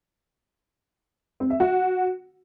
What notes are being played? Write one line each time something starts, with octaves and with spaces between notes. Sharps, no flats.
C4
E5
F#4